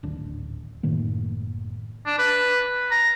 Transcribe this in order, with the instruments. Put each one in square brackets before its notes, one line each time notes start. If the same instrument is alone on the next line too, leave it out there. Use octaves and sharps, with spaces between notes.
[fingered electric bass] D1 G#1 D4
F#1 A2 D#3 A#3
[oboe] D4
B4
A#5